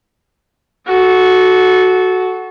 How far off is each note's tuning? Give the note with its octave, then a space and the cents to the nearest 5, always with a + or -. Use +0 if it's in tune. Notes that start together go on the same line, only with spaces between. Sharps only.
F#4 +0 A4 -20